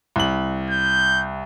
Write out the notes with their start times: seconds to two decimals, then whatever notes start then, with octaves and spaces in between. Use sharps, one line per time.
0.16 C2 F#7
0.71 G6